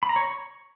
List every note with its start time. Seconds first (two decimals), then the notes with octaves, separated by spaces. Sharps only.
0.03 B5
0.09 A#5
0.16 C#5
0.23 C#6